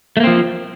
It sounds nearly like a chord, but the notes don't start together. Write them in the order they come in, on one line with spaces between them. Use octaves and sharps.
A3 A#3 C4 F3